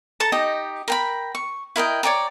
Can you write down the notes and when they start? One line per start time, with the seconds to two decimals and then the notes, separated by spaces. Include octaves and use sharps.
0.20 A4 A5 A#5
0.32 D#4 G4 D#5
0.88 A#4 G5 B5
1.35 C#6
1.76 E4 A#4 D#5 G5
2.03 C#5 D5 G5 A#5